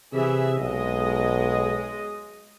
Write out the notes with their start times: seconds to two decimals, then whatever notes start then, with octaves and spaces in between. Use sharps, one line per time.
0.13 C3 E3 G#4 E5
0.60 B1 G#3 D#5